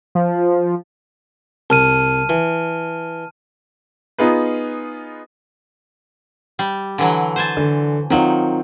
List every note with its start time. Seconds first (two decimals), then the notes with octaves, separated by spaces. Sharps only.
0.15 F3
1.70 C2 A5 F6 D#7
2.29 E3
4.18 B3 D#4 F4 G#4 B4
6.59 G3
6.98 D3 E3 F#3
7.36 C5 G#5 A5
7.57 D3
8.10 D#3 F#3 C4 D#4 F4